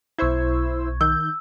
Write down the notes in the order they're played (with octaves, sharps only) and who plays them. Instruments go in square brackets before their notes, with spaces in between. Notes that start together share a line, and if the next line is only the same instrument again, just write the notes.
[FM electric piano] B1 C#6 G#6 [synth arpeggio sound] E4 C5 E6
[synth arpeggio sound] D#3 G6 [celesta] E6